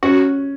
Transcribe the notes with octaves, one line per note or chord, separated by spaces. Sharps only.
C#4 F#4